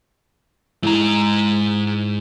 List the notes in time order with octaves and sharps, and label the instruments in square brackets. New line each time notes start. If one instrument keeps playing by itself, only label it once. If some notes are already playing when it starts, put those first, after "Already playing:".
[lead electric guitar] G#2 A#5 [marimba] E4